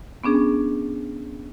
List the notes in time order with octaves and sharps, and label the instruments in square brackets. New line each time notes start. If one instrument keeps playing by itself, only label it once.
[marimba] B3 C#4 D4 G#4